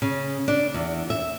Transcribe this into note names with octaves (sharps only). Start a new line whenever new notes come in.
C#3
D4
E2
E5